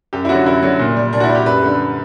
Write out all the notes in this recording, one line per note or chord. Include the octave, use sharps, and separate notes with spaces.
F#2 G4
E4
D3 F#3 F#4
F#2 E4
D3 F#3
A#2
G3
A#2 D4
F#4
E4
G3
G4
F#2 B4
D3 G3